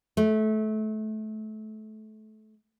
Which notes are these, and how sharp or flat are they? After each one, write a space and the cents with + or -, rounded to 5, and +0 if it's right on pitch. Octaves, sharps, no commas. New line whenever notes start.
A3 -25